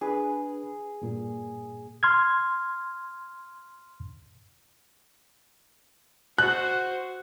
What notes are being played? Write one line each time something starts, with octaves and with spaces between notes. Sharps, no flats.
D4 G#4 B4
G2 A#2
C6 F6 G#6
F#4 C5 F#6